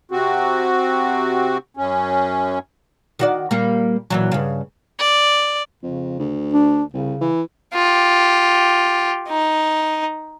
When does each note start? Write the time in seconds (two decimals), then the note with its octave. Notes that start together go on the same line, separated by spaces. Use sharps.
0.11 C3 C4 F#4
1.77 F#2 C#4
3.19 D#3 F#4 D5
3.51 A#2 G3 A#3
4.10 A#2 E3 F#3
4.32 G2 C#3
4.99 D5
5.83 F2 C#3
6.19 D2
6.53 D4
6.93 C2 C#3
7.21 E3
7.74 F4 G4
9.29 D#4